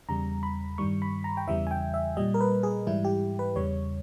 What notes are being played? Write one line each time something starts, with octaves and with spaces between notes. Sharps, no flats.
E2 C#3 G3 A#5
B5
G2 D#3 G3 C#6
B5
A#5
G5
E2 C#3 E3 G3 E5
G#5
G5
E5
A#2 G3 D#5
A#4
B4
G#4
G#2 E3 G3 E4
G4
B4
E2 C#3 G3 C#5